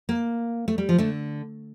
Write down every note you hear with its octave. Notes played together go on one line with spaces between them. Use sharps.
A#3
A3
G3
F3
D3 A3